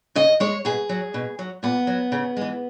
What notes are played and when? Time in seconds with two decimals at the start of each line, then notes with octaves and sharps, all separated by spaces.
0.15 C#3 D#5
0.40 G#3 C#5
0.65 B2 G#4
0.89 F#3
1.14 B2
1.39 F#3
1.63 A#2 B3
1.87 F#3
2.12 C#3
2.37 E3 G#3